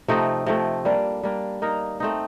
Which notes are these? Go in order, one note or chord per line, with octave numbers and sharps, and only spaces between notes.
C3 F3 A3 D#4
C3 F3 A3
G3 A#3 D4
G3 A#3 D4
A#3 D#4 A#4
A3 C4 D#4